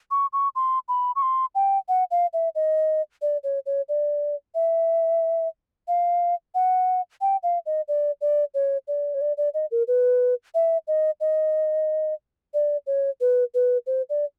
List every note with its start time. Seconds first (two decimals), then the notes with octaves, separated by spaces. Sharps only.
0.11 C#6
0.33 C#6
0.56 C6
0.88 B5
1.16 C#6
1.22 C6
1.55 G5
1.89 F#5
2.11 F5
2.33 E5
2.55 D#5
3.22 D5
3.44 C#5
3.66 C#5
3.89 D5
4.55 E5
5.88 F5
6.55 F#5
7.21 G5
7.43 F5
7.66 D#5
7.88 D5
8.21 D5
8.54 C#5
8.88 D5
9.14 C#5
9.21 D5
9.37 D5
9.54 D#5
9.71 A#4
9.88 B4
10.54 E5
10.88 D#5
11.21 D#5
12.54 D5
12.87 C#5
13.21 B4
13.54 B4
13.87 C5
14.10 D5